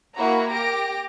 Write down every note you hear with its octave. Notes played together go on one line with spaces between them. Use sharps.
A#3 E4 F#4 A#5
G4 A#6 D7